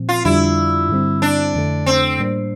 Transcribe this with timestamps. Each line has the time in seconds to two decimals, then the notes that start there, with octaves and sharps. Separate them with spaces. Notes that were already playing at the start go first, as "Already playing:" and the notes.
Already playing: A#2 F3 C4
0.09 F4
0.25 F2 D3 G3 D4 E4 F4
0.89 G2 D3 G3 C4
1.22 D4
1.55 F2 D3 A3
1.86 C4
2.19 A2 G3 A#3 D4